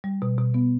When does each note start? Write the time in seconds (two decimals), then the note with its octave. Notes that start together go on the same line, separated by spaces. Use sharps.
0.04 G3
0.22 B2
0.38 B2
0.54 B3